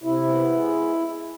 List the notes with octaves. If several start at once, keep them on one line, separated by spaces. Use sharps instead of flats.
C3 E4
B3
G#3